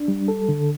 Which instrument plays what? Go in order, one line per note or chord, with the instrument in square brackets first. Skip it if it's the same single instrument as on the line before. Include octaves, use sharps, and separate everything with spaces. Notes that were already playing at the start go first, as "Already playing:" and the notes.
Already playing: [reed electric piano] D4
G3
A4
D3